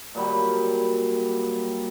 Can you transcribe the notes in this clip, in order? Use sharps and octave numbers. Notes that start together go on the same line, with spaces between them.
A#2 F#3 G3 B5